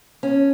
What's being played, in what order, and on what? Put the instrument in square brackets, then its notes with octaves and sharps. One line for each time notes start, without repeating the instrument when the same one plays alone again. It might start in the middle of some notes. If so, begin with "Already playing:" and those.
[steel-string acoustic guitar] C#4